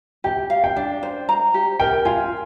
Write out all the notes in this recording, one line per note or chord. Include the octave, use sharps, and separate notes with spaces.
G4 G5
F5
G5
D4
C5
A#5
G4
A#4 G5
F4 G#5